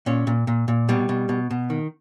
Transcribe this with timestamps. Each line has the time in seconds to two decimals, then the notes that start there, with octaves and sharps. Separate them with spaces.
0.06 A#2 C#4
0.27 A#2
0.47 A#2
0.68 A#2
0.89 B2 G3
1.09 B2
1.29 B2
1.51 B2
1.70 D#3